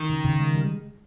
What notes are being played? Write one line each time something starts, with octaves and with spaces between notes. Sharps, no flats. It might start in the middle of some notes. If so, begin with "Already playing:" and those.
Already playing: D#3
C#3
C#3
G#3
G3